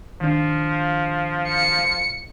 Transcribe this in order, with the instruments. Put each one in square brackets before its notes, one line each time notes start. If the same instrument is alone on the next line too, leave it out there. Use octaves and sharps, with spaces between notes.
[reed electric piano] D#3 D4 [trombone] F3
[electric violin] C#7